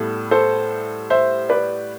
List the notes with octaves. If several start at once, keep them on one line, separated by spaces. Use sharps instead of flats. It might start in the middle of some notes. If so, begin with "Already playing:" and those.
Already playing: A2 G3 B3 E4 A4
A4 C5
C5 E5
B4 D5